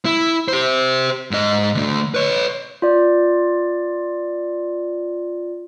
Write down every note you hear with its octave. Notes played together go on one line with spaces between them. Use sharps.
E4
G4 C5
G#2 D#5
D3 A3
B4 C#5
F4 D5